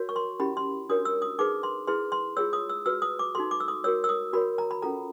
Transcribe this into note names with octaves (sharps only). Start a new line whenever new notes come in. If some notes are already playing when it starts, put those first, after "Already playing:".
Already playing: F#4 A#4 C#5
C#6
C6
C#4 E4 G4 B5
C6
D4 F#4 A#4 C#5 D#6
E6
D#6
D#4 G#4 B4 D6
C6
E4 G#4 B4 C6
C6
F4 G#4 C#5 E6
D#6
E6
F#4 B4 E6
D#6
D6
D#4 F#4 A4 C6
D6
E6
D#6
F#4 A#4 C#5 E6
E6
D#6
F#4 A#4 C#5 B5
A#5
B5
C#4 F4 A4 A#5